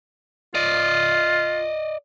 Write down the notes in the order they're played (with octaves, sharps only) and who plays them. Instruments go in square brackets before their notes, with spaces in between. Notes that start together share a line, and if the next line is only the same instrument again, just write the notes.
[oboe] F4 [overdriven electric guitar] D5 D#5